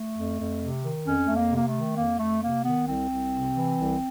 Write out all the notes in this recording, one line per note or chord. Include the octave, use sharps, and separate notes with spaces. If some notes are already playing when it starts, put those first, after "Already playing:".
Already playing: A3
F2
F2
C3
D#3
F2 C#4
F2 A3
A#3
C3 A#3
A3
D#3
F2 A#3
F2 A3
C3 A#3
D#3 B3
C2 C4
C2
C3
E3
C2